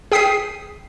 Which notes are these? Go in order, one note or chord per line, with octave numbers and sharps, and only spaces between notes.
G#4 G5 D#6 B6 C7 D#7